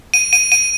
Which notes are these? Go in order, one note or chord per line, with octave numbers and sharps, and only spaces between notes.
D#7
D#7
D#7